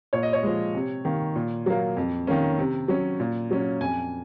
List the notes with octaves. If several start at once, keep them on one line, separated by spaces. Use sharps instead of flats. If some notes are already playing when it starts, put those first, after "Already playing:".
A#2 C#5
D#5
C#5
F3 G#3
C3
D#3 A#3
A#2
F#3 A#3
F2
D#3 A#3 C#4
C3
F#3 C#4
A#2
F#3 C#4
F2 G#5